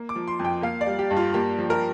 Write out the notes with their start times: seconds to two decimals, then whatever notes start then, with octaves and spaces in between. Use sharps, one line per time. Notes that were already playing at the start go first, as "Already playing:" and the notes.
Already playing: A#3
0.09 D6
0.15 F3
0.27 C6
0.39 F2
0.45 G5
0.63 A#3 F5
0.81 D5
0.86 G3
0.99 G4
1.11 G2
1.17 F4
1.34 A#3 G4
1.58 F3
1.70 A#4